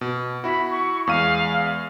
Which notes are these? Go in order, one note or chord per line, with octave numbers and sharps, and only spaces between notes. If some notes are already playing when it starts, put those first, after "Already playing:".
B2
E4 F#4 B5
C#6
E2 G#3 F5 D#7